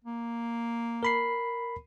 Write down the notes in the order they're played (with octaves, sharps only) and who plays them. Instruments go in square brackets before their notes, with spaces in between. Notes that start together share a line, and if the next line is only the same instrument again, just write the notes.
[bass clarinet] A#3
[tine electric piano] A#4 B5 C7